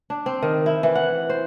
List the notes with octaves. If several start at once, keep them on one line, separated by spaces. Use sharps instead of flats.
D4
C4
D#3
E4
E3
F#5
C5